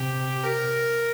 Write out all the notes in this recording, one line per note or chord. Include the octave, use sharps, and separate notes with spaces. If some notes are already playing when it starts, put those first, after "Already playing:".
Already playing: C3 G4
A#4